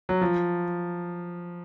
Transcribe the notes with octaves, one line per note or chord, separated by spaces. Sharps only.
F#3
F3